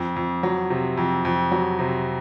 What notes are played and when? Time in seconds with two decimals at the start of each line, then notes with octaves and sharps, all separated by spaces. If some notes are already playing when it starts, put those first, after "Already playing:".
Already playing: F2
0.16 F2
0.43 F#3
0.70 C3
0.97 F2
1.25 F2
1.52 F#3
1.79 C3